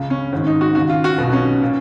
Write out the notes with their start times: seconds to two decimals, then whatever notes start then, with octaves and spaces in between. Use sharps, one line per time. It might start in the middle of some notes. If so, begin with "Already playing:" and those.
Already playing: C#2 C#3
0.10 C#4
0.32 G#1 G#2 D#3
0.47 D#4
0.61 F#4
0.75 D#2 C#3 F#4
0.89 F4
1.04 F#4
1.18 B1 B2 F4
1.33 C#4
1.62 A#2